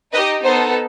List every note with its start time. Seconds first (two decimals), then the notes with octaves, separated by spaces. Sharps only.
0.13 D#4 B4 D#5
0.18 G4
0.43 B3 D#4 A4 C5